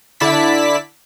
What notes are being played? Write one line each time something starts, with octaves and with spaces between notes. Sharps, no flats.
D3 E4 D5 A5 B6